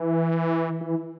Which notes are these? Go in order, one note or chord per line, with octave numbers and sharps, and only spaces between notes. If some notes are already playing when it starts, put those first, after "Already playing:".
Already playing: E3
E3